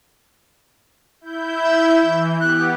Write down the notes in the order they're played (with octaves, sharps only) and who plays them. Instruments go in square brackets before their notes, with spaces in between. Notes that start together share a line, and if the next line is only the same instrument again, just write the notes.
[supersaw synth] E4 G6
[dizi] E5
[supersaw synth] E3
[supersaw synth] B3 G4 [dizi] F#6